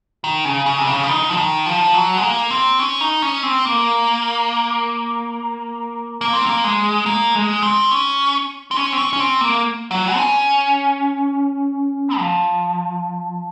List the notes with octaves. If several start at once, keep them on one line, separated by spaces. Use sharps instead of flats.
D#3
C#3
C#3
C3
C#3
F3
D#3
F3
D#3
F3
F#3
G#3
A#3
C4
C#4
D#4
C#4
C4
A#3
A#3
C4
A#3
G#3
A#3
G#3
C4
C#4
C4
C#4
C4
C#4
C#4
C4
A#3
F#3
C4
C#4
F3